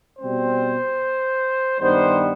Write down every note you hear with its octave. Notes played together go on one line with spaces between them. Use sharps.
B2 G3 C4 C5
G2 D#3 G3 B3 C5